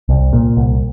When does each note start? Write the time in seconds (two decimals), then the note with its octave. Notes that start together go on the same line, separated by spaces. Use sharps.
0.09 C2
0.33 A#2
0.57 C2